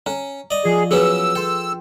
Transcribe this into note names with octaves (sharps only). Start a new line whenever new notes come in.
C#4 A#5
D5 D#5
F3 G#4
F#3 B3 C#4 G#4 B4 E6
A4 G5 C6